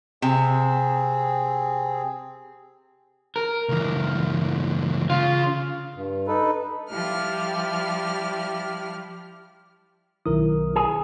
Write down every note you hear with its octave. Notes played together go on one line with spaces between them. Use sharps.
C3 C4 G#4
A#4
C#2 E3
C#3 F4
G2
D#4 A4 B4
F3 G3 E4 F6
B1 D#3 E4 A#4 D#6
G#4